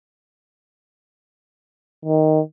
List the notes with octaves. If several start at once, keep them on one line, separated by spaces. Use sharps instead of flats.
D#3